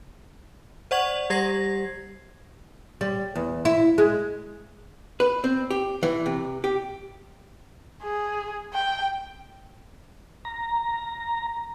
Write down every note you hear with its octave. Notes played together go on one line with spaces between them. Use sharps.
C5 D5 F#5 C#6 G#6 F#7
G3 G4 F#5 G#6 A#6 C7
G3
E2
E4
G#3
B4
C4
G4
E3
C3
G4
G#4
G5
A#5